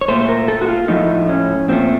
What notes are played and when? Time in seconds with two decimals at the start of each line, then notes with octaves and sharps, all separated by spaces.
0.01 C#5
0.08 A#2 A3 C5
0.21 C5
0.29 A#4
0.48 A4
0.61 F#4
0.68 F4
0.88 A2 F3 A3 D#4
1.29 C#4
1.68 A#2 F3 A3 C4